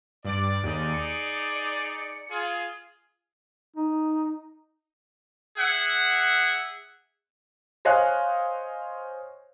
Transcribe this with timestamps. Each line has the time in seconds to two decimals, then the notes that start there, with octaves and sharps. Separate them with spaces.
0.25 G2 D5
0.63 D#2 D#4 G#4 D5
0.94 C#7
2.30 F4 G#4
3.77 D#4
5.58 G#4 E5 F#5
7.85 C5 C#5 D#5 F5 G#5 F#6